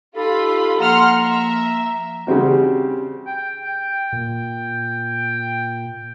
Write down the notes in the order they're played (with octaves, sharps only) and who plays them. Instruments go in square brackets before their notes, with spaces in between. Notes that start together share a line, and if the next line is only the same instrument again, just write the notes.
[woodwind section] D#4 G4 A4 [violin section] F4 B5
[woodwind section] F3 A#3 A#5 [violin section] F#5 C6 F6
[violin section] E5
[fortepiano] C#3 G3 C4 F#4
[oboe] G5
G5
[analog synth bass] A#2